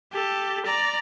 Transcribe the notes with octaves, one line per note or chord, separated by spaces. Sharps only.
G4 A4
D5 A#5